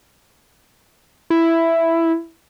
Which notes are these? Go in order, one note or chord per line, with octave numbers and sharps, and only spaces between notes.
E4